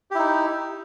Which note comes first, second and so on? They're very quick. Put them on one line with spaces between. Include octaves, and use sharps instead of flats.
G4 E4 D#4